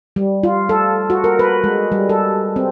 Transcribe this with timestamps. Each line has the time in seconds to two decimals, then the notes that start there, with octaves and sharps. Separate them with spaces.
0.16 G3
0.43 F4
0.69 A4
1.10 F#4
1.24 A#4
1.39 B4
1.64 G#3
1.92 G3
2.09 A4
2.56 C4